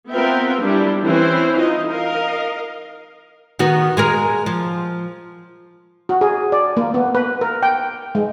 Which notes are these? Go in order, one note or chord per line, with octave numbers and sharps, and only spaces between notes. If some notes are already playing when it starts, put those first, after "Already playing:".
B3 C4 F4 A#4 E5 G5
G3 D4 E4
E3 C4 C#4 E4 C5
D#4 F4 D#5
A#4 D#5 F5
D#3 B3 F#4
G#3 G#4 A#4
F3
F#4
G#4
D5
A#3
B3
B4
A#4
G5
G#3